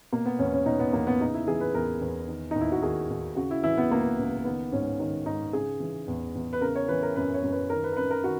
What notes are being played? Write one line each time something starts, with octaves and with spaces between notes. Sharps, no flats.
B2 A#3
B3
E2 C#4
C#4
B2 D#4
B3
E2 A#3
B3
C#3 D#4
E4
E3 G#4
B4
E2 A#4
E2
D#3
D#2 D#4
E4
F#4
D#3 G#4
D#2
C#3 F#4
E4
E3 E4
B3
C#2 A#3
C#2
D#3 B3
G#2 C#4
D#3
G#2 D#4
C#3 G#4
E3
E2
E2
B4
C#3 A#4
C#5
E3 B4
A#4
F#2 B4
C#5
F#2
B4
D#3 A#4
B4
A#4
F#2 B4
A#4
D#3 F#4